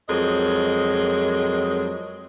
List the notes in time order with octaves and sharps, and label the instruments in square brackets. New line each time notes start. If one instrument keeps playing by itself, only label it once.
[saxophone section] F2 F#3 G#3 A#4 D#5